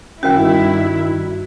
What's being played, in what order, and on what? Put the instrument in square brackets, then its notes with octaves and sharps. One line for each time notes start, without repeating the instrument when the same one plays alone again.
[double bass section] G2 D#3 G3 [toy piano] C#4 A#4 G5 [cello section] E4 [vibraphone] F#4